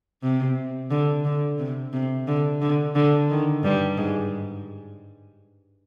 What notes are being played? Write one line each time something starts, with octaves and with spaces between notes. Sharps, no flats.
C3
D3
D3
C3
C3
D3
D3
D3
D#3
G2 G3
G#2 G#3